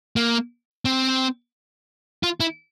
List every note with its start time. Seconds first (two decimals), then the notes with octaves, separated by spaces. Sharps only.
0.16 A#3
0.85 C4
2.23 F4
2.40 E4